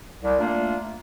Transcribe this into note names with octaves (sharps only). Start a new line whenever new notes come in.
C2
A3 A#3 D4 F4